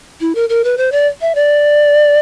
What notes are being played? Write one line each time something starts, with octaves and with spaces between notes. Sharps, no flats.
E4
A#4
A#4
B4
C5
D5
E5
D5